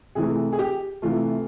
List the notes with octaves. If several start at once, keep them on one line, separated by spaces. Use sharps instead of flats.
C3 E3 A3 G#4
G#4
G4
C3 E3 A3 F4